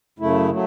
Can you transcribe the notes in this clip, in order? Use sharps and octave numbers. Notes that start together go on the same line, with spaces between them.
F#2 C#3 A3 E4
F#3 A3